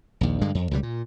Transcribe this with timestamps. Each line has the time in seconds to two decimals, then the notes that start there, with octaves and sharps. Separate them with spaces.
0.21 A#1 D#2
0.41 G2 D3 G#3
0.55 F2
0.71 C#2 B2 G3
0.83 A#2